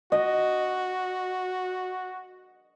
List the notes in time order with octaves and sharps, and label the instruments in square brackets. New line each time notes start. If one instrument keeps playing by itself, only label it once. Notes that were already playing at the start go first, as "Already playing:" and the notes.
[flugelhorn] F#4 [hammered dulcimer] D#5